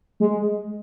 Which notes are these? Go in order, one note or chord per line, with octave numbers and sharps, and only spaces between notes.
G#3